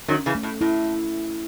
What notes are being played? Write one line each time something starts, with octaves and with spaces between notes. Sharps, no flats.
D#3 F#3 C#4
C#3 E3
A3
A2
A2 E4